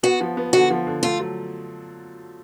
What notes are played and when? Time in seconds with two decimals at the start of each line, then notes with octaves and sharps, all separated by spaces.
0.03 B3 F#4
0.21 F3
0.37 B3
0.53 D3 F#4
0.71 F3
0.87 D3
1.03 A3 F4
1.20 F#3